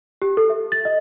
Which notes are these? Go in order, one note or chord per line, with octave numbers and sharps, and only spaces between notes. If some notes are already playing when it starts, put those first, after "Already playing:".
G4
A4
E5
A6
D#5